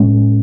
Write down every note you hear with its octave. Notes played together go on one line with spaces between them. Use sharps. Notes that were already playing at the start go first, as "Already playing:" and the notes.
Already playing: A2 G#3 C#4